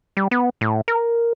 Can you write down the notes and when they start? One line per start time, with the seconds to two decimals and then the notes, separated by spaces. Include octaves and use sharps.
0.17 G3
0.31 B3
0.61 A2
0.88 A#4